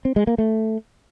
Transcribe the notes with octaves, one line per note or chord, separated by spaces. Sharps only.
C4
G#3
A#3
A3